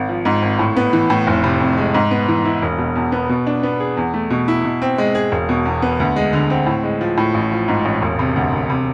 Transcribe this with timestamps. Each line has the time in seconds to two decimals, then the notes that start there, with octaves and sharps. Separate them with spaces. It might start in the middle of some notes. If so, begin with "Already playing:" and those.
Already playing: G#1
0.09 F3
0.25 G#2
0.42 G#1
0.59 A2
0.77 B3
0.93 E3
1.10 A2
1.27 F1
1.44 C3
1.61 F2
1.77 G#3
1.95 G#2
2.11 B3
2.28 E3
2.45 E4
2.62 E1
2.78 B2
2.96 E2
3.12 B3
3.29 B2
3.47 D4
3.63 B3
3.80 G#4
3.97 E2
4.14 A3
4.30 B2
4.48 E4
4.64 B2
4.82 C4
4.98 G#3
5.15 G#4
5.32 E1
5.49 B2
5.66 E2
5.82 B3
6.00 D2
6.16 G#3
6.33 D3
6.50 C4
6.67 A2
6.83 G#3
7.01 F3
7.18 A2
7.34 A1
7.51 F3
7.68 G#2
7.85 A1
8.02 E1
8.19 C3
8.36 D2
8.53 E1
8.70 C3